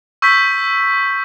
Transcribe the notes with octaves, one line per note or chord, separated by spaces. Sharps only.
C#6 E6 G6 B6